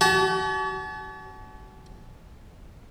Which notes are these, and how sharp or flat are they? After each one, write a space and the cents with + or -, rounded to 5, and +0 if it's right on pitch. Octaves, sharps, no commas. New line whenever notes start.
F#4 +45 A5 -40